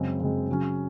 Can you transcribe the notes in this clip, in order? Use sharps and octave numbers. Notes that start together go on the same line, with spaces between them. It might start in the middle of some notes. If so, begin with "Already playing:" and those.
Already playing: F#2 C#3 G#3 C4
F#2 C#3 G#3 C4
C#3 F#3 C#4